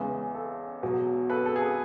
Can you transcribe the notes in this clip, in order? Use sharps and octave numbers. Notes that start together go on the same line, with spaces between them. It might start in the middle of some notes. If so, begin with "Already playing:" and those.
Already playing: E2 C#3 E3 G#3
A4
E2 B2 F#3
A4 B4
A4
G#4
A4